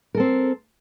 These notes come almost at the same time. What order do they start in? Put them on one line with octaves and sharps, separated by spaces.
A#4 A4 C4